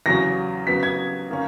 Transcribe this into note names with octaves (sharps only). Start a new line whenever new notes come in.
E2 C#3 F#3 C#4 A#6
C#3 F#3 B3 B6
G#6
D#3 A#3 C#4